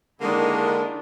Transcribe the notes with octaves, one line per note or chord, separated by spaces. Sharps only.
D3 D#3 G#3 A#3 D4 E4